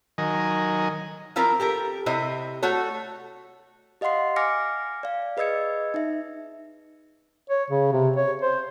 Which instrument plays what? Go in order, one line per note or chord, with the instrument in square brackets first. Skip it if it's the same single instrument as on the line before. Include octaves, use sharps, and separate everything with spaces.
[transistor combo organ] D#3 F#3 A#4 D#5 G#5
[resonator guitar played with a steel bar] F3 C4 E4 F4 A#4
G4 A4 A#4
C3 E4 C5 D#5
A3 F#4 A4 C#5
[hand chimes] G4 D#5 F5 F#5 C6 C7
G#5 D6 F6 A#6 C#7
D5 F5
G#4 B4 D#5 E6 G#6 C#7
D#4 E5
[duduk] C#5
C#3
C3
C#5
C5